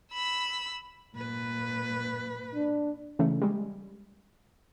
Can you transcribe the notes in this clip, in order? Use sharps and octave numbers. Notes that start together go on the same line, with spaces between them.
B5 E6
A#2 B4
D4
C#3 E3 A3
G3 G#3